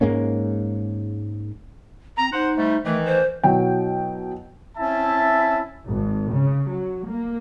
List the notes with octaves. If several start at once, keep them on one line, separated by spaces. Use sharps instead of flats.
G#2 G#3 A#3 C#4
C4 A#5
D#4 C5 F#5
G#2 G3 A3
D#3 E3 A3
C5
B2 F#3 E4 G5
C4 C#4 E4 E5 A5
G#1
C#3
F#3
A#3